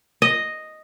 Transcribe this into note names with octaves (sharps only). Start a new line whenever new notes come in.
D#5